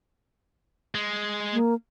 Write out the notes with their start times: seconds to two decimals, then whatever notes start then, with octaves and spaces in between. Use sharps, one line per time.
0.95 G#3
1.53 A#3